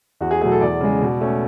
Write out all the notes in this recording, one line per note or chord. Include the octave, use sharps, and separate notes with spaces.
E2 F#4
G#4
B2 F#3 A3 G#4
A4
E2 D5
C#3 G#3
B2
A3 C#4